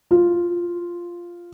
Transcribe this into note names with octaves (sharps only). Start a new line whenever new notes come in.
F4